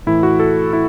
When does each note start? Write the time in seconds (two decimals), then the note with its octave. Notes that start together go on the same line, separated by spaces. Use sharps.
0.07 A2 E3 E4
0.23 F#4
0.40 A4
0.73 E4